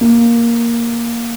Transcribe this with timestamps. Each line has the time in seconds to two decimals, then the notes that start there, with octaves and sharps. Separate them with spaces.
0.01 A#3